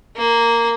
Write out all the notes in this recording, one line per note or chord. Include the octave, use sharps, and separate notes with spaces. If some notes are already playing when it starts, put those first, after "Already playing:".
A#3